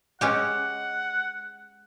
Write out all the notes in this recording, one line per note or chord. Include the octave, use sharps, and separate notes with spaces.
G#3 C#4 G4 F#5